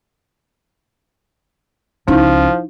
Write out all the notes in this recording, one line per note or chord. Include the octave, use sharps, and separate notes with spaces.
C#2 F3 C#4 D#4 E4